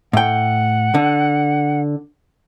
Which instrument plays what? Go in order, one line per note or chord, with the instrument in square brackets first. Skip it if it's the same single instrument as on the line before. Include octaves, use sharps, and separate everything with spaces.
[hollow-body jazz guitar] A2 G5 [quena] F#5
[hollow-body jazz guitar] D3